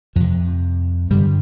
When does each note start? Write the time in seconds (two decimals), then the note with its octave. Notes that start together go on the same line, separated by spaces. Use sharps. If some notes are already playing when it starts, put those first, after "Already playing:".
0.16 F2 C3 F3
1.11 G2 D3 G3